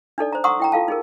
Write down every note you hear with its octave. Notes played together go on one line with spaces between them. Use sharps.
D4 D#4 A4 D5
C5 A#5
F#5 A#5 C6 C#6 D#6 E6
E4 G5 A#5
F4 A4 F5 A5
D#4 G#4 A#4